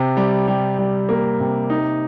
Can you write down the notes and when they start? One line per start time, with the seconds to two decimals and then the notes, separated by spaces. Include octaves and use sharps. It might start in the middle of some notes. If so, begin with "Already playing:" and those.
Already playing: C3
0.17 G3
0.48 G3
0.78 G3
1.09 A#3
1.40 C3
1.70 D#4